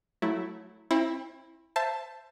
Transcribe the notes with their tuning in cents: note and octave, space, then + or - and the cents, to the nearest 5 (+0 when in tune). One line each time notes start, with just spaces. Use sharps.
F#3 +0 A3 -5 E4 +0
C4 +35 E4 +0
C5 +0 E5 +25 A5 +0